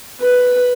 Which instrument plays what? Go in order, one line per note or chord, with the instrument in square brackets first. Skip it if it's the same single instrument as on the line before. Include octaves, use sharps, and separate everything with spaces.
[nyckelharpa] B4